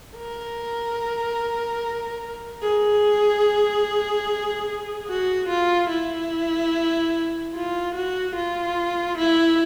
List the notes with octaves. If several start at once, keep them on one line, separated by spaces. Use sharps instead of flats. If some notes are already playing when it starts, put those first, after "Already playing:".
A#4
G#4
F#4
F4
E4
F4
F#4
F4
E4